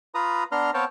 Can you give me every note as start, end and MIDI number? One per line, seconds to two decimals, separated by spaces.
0.15 0.44 65
0.15 0.44 71
0.15 0.44 82
0.15 0.44 87
0.52 0.71 59
0.52 0.71 62
0.52 0.71 82
0.52 0.71 84
0.52 0.71 89
0.74 0.85 59
0.74 0.85 60
0.74 0.85 73
0.74 0.85 77
0.74 0.85 79
0.74 0.85 81